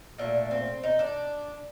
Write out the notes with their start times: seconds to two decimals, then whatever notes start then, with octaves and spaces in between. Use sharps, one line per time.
0.18 A#2 A3 D4
0.51 C4
0.83 D#4
0.99 D4